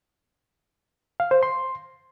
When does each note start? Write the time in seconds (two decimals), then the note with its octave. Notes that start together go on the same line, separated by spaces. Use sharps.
1.20 F5
1.31 C5
1.43 C6